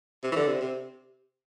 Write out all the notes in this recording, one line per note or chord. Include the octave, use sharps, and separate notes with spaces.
C3
E3
D3
C3
C3